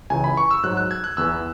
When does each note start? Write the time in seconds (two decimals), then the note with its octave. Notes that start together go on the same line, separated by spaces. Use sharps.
0.10 C#2 C#3 E3 G#5
0.24 B5
0.37 C#6
0.51 E6
0.63 G#2 F#3 F#6
0.77 F#6
0.91 G#6
1.04 F#6
1.17 E2 E3 E6